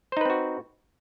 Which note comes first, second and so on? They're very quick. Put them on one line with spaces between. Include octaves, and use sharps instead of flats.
C5 D#4 B4 C4 F#4